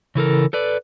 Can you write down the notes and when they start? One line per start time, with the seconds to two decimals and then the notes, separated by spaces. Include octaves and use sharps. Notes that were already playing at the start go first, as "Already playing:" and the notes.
0.15 C#3 E3 A4 A#4
0.53 A4 B4 D5